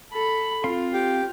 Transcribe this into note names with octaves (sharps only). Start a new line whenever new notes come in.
A4 B5
C4 F4 F5 C6
G4